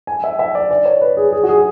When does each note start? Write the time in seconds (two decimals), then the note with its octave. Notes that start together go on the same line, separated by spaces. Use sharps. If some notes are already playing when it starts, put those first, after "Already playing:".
0.07 G#5
0.24 E5
0.39 E5
0.55 D5
0.71 D5
0.85 C#5
1.01 B4
1.17 G#4
1.32 G#4
1.43 F#4
1.49 G#4